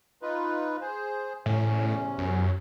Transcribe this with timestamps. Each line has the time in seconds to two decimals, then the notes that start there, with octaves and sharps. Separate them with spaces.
0.22 D#4 F4 B4
0.81 G#4 C5
1.46 E2 A2 C3 C#4
2.18 F#2